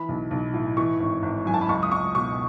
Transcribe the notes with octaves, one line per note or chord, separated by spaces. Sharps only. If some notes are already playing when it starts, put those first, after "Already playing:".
Already playing: E3 B5
B1
B1
A2
E3 C#6
G#1
G#1
F#2 G#5
A5
B5
C#2 C#6
D#6
C#2 C#6
B2 C#6